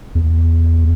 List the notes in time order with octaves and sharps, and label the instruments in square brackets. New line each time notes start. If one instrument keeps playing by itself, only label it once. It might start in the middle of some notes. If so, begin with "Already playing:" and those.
[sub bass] E2